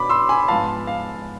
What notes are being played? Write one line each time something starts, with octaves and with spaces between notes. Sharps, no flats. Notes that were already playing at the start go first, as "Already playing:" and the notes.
Already playing: B2 B3 D4 B5 D6
C6 E6
G#5 B5
G#2 F3 B3 F5 A5
F5